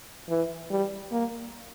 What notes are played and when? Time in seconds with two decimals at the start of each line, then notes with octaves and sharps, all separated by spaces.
0.29 E3
0.71 G3
1.12 A#3